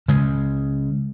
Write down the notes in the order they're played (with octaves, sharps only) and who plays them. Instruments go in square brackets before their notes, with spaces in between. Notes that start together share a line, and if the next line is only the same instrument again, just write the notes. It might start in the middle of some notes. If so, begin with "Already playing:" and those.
[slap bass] C#3 G#3